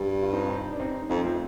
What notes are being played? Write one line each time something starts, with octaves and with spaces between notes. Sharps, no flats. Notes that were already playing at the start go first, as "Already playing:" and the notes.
Already playing: G2
F4
C4 D#4
F4
C4 D#4
D4
C4 D#4
F2 C4 D#4
A3 C4